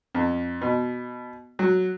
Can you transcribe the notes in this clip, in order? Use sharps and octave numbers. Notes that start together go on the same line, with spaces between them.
F2
B2
F#3